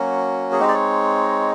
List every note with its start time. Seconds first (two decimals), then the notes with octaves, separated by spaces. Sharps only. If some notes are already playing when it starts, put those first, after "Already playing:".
Already playing: F#3 A#3 C#4 F#4
0.52 G#4
0.60 G#3 C4 D#4 G4
0.68 D5
0.74 C#5